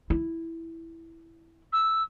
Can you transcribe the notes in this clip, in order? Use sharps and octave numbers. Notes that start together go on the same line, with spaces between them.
E4
E6